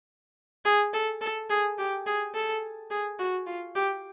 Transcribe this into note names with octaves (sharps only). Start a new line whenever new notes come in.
G#4
A4
A4
G#4
G4
G#4
A4
G#4
F#4
F4
G4